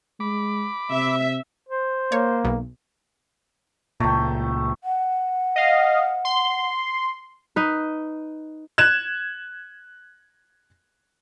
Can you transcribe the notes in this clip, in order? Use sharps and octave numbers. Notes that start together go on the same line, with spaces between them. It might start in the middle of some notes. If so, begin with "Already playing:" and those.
G#3 B5 D6
C3 E5
C5
A#3 C#5
B1
C#2 A#2 A3 G5
F#5
D#5 F5
C6
D#4 B4
F#6 G#6 E7